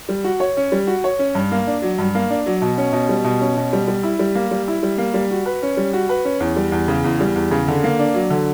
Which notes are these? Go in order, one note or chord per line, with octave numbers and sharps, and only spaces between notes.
G3
F#4
C#5
C#4
G3
F#4
C#5
C#4
G2
A#3
D4
F#3
G2
A#3
D4
F#3
B2
C#4
B2
G3
B2
C#4
B2
G3
G3
E4
G3
A#3
G3
E4
G3
A#3
G3
F#4
B4
C#4
G3
F#4
B4
C#4
E2
G3
E2
C#3
E2
G3
E2
C#3
D3
A#3
D4
F#3
D3